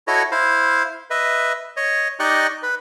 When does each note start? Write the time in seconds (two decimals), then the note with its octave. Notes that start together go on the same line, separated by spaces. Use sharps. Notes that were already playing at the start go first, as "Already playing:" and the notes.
0.08 E4 F#4 A4 C#5 D#5
0.32 E4 C5 F5
1.10 B4 D#5 E5
1.77 C#5 D#5
2.20 D#4 G4 D5 D#5 C#6 F#6
2.63 B4